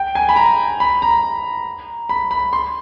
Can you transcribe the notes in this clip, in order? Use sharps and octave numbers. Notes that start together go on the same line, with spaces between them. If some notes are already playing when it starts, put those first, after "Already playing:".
Already playing: G5
G#5
B5
A#5
B5
A#5
B5
B5
C6